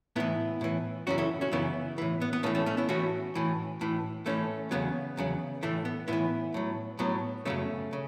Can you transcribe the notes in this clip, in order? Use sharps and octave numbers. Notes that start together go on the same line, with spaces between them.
A2 E3 B3 E4
A2 E3
F#2 C#3 E3 C#4 F#4
E4 A4
C#4 F#4
F#2 C#3 E3 B3 E4
A2 E3
B3
B3
A2 E3 A3 C#4
A3 C#4
A3 C#4
B3 E4
A2 E3 C#4 F#4
A2 E3
A2 E3
A2 E3 A3 C#4
E2 C#3 F#3 B3
E2 C#3 F#3
A2 E3 A3
B3
A2 E3 B3 E4
A2 F#3
A2 F#3 B3
F#2 C#3 F#3 A3 C#4
C#3